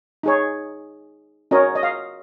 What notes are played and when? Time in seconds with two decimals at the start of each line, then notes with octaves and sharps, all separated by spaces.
0.23 D#4 G#4 C#5
1.51 C#4 F#4 A#4 C#5 D#5
1.75 D#5
1.83 F5